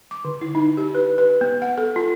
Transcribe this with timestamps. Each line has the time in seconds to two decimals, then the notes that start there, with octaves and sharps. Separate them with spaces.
0.11 D6
0.25 D3
0.41 E4
0.55 D#4
0.77 G4
0.95 B4
1.18 B4
1.41 B3
1.62 F#5
1.78 A4
1.96 F4